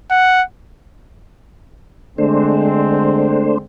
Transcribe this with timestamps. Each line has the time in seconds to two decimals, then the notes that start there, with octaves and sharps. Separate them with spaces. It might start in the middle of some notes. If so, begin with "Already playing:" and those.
0.11 F#5
2.18 D3 G#3 A3 C4 D4 C5